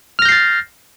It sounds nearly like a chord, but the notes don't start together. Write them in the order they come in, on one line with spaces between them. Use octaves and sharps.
F6 A#6 G6 C7 A6